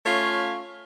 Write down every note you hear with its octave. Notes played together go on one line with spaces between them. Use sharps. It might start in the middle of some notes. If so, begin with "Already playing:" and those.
A3 C#4 F4 C#5 F5